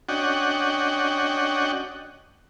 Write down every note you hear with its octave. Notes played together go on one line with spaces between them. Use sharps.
C#4 D4 F#4 D#5 F#5 G5